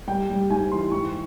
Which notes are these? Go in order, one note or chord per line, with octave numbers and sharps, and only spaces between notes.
G3 G5
G3
G#2 G#5
E3 C6
G#2 C#6